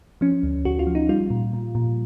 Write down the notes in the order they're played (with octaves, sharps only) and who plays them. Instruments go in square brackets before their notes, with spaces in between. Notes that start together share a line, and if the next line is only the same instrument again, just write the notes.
[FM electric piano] F3 C#4
D2
D2 F#4
F4
F3
D#4
G3 F4
A#2
A#2
A#2